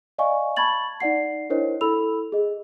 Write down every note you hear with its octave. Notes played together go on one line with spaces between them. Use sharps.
D5 D#5 F5 G#5 C#6
A5 B5 C#6 G#6 A6 F#7
D#4 D5 F#5 C7
D4 E4 A#4 C5 C#5 D#5
E4 A4 B5 E6 F7
G#4 D#5